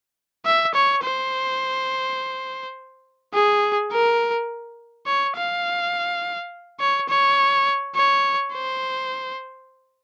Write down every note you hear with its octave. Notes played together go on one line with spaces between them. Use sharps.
E5
C#5
C5
G#4
A#4
C#5
F5
C#5
C#5
C#5
C5